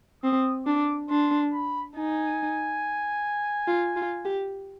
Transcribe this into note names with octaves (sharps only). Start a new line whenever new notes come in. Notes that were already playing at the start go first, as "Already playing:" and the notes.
C4 D#6
D4 D6
D4 C6
B5
D#4 G#5
F4
F4
G4